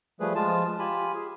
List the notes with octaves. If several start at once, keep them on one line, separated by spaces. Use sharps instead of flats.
F3 G3 A3 G#4 B4
F3 G#3 F4 A5
F4 G4 G#5 B5
G#4